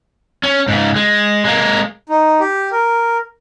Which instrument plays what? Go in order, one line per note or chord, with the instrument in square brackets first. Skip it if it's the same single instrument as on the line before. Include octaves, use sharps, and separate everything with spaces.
[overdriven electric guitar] C#4
G#2 C#3
G#3
G#3 A#3
[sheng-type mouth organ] D#4
G4
A#4